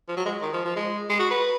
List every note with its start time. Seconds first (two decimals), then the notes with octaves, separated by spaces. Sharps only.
0.08 F3
0.17 F#3
0.26 G#3
0.42 D#3
0.53 F3
0.65 F3
0.76 G#3
1.09 G#3
1.19 F#4
1.31 B4